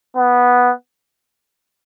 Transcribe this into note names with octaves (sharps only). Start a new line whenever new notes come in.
B3